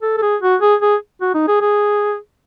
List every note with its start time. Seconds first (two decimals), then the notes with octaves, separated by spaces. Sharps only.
0.02 A4
0.17 A4
0.22 G#4
0.42 F#4
0.61 G#4
0.82 G#4
1.21 F#4
1.34 D#4
1.48 G#4
1.61 G#4